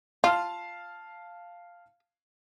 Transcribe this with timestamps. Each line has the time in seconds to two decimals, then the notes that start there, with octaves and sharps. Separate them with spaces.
0.24 F4 F5 A5 F6